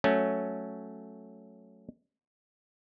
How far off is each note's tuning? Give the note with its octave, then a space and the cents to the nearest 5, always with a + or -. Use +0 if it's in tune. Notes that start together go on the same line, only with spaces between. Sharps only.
F#3 +0 A3 +0 C#4 +0